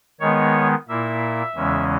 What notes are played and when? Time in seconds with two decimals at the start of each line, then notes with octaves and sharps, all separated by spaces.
0.20 D#3 G#3 B3 C#5
0.89 A#2 A#3 E4 E5
1.55 E2 C#3 E3 G#3 C#4